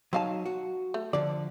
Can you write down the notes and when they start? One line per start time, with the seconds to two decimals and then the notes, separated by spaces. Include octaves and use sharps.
0.13 F#3 C4 D#4 F5 A5
0.46 F#4
0.94 A3
1.13 D3 F3 D5